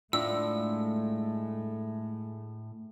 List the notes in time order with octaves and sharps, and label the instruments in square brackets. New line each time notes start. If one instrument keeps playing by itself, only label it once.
[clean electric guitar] A2 [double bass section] G#3 A3 [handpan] D4 F4 [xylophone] E6